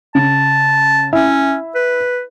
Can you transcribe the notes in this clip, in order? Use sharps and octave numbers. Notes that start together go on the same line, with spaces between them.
C#3 A5
C#4 E4 E5
B4